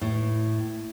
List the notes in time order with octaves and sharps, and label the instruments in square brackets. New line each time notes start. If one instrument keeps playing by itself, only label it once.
[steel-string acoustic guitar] A2